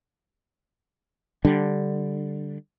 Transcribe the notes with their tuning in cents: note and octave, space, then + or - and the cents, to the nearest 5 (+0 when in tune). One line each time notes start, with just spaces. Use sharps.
D3 +0 G3 +0 D4 +0